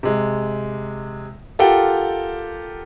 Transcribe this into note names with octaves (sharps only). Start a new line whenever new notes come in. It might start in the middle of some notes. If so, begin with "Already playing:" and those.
C3 G#3
F4 G4 A4 A#4 F#5 G5